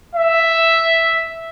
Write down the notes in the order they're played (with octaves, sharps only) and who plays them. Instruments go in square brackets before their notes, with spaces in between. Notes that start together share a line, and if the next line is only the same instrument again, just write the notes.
[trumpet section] E5